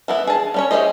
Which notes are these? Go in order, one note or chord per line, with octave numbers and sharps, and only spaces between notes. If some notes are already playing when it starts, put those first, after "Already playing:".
E3 B3 E4
G#4 A5
G3 C#4 C#5
E4 G4 G#4 C5 D#5